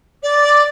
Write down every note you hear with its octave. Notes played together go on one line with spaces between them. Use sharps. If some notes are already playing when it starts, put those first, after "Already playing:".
D5